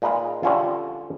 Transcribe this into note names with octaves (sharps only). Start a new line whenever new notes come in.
A#2 G#3 D#4 B4 F5
D3 F3 G3 C#4 E4 F4